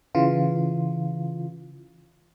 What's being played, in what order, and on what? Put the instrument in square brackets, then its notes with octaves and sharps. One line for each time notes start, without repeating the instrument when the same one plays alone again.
[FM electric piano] C#3 E3 F4